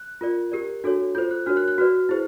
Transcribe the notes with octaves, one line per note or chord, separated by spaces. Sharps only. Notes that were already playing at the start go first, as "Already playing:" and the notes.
Already playing: F#6
F4 A#4 D5
G4 A#4 D5
D4 F#4 A4 C#5
F4 A4 C5 G6
F#6
D4 F#4 A#4 C#5 F6
F#6
F#6
F#4 B4 D5 F6
E4 G#4 C5